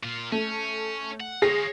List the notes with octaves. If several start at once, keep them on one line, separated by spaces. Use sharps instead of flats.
A#2 F4
A3 C#4
F#5
F4 G#4 C#5 A#6 C7